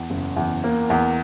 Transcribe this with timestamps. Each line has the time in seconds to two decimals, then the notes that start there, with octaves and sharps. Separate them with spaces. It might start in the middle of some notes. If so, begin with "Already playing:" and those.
Already playing: E2
0.10 F#1
0.36 E2
0.64 A#3
0.90 E2